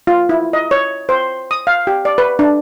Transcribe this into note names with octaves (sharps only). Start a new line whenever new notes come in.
F4
E4
D#5
C#5
C5
D#6
F5
G4
D5
B4
D4